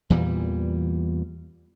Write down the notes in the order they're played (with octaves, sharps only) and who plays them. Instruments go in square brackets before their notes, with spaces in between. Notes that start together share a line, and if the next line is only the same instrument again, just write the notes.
[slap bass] E2 A#2 E3 G3